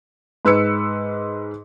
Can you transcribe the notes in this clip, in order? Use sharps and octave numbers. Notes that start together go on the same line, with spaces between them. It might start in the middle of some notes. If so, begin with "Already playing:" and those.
G#2 B4 E6 C#7